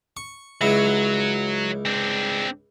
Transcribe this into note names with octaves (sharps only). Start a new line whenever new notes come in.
C#6
C#2 F#3 E4 F#4
C4 D4